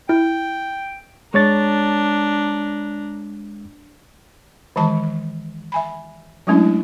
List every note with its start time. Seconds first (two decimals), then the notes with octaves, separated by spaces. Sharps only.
0.09 E4 G5
1.34 G#3 D4 C#5 A#5 A6
4.76 D#3 E3 G#3 A5 B5
5.72 E5 G#5 B5
6.47 F#3 G#3 A3 C#4 D4 E4